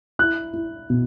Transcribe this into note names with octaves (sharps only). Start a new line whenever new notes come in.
E4 F#6
E4
B2